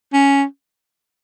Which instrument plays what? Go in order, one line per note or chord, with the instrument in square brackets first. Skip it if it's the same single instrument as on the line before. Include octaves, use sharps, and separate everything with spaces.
[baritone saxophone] C#4